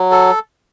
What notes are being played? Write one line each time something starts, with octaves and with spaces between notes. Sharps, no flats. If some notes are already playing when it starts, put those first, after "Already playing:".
Already playing: F#3
A4